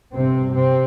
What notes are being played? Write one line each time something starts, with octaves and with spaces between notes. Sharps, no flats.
G1 G2 C3 C4
C3 C4